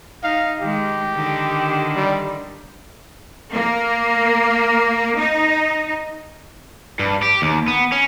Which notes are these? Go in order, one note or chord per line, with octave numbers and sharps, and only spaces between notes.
D#4 F5
D#3 G#3 G4
D3 D#3
G3
A#3
D#4
G2
G4
D#2
B3
C#4